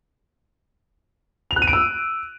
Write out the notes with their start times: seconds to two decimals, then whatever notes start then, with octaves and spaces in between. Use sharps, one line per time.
1.51 F7
1.56 F#6
1.62 D#7
1.68 D7
1.73 E6